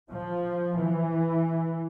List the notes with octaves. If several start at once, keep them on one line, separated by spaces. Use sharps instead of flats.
F3
E3